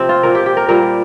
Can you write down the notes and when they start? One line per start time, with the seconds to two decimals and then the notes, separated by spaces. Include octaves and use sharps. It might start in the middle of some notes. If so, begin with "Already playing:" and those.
Already playing: C3 F3 C4
0.09 F4
0.23 A#2 A#3 A#4
0.35 G4
0.46 G4
0.57 A#4
0.68 A#2 G3 A#3 A#4